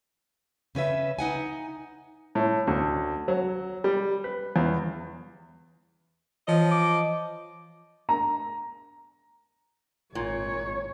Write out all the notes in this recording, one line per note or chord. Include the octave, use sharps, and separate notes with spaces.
C#3 C#4 B4 E5
D#4 F#5 G#5
A2
D2
F#3
G3
B4
E2
E3 F3 D#5
D6
A#5
G#1 A#2 C#5